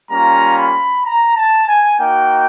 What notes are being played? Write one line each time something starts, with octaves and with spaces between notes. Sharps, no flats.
G3 A#3 C#4 F4 A#5
B5
A#5
A5
G#5
A#3 D#4 F#4 G5